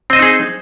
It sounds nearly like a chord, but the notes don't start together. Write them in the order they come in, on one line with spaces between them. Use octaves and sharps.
C4 D#5 C5 D#4 G#4